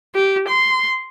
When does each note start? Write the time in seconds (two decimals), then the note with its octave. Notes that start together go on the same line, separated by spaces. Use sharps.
0.15 G4
0.48 C6